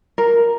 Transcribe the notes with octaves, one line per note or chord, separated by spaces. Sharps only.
A#4